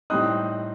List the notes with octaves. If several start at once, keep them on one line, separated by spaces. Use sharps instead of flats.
A2 G3 C4 D#4 D#6 F#6